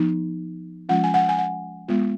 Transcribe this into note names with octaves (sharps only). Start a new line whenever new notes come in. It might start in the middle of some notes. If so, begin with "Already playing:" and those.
Already playing: F3 B3 D#4
F3 G#3 C#4 F4 F#5
G#5
F#5
G#5
F#5
G#3 B3 F4